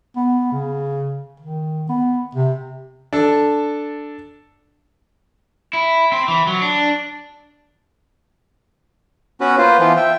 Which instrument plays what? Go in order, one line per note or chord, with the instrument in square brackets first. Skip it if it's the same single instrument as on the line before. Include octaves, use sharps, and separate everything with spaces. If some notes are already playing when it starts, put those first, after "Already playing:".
[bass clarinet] B3
C#3
D#3
B3
C3
[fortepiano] D4 A4
[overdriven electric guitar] E4
C4
E3
F#3
D4
[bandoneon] B3 C#4 F#4 B4
A#3 F4 B4 C5
E3 F3 B3 F4
E5 G5